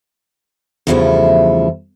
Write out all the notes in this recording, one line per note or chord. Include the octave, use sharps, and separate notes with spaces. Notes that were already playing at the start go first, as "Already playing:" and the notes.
E2 G2 C#3 F3 A3 E4